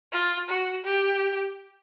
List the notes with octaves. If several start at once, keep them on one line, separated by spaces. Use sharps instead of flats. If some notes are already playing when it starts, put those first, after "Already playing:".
F4
F#4
G4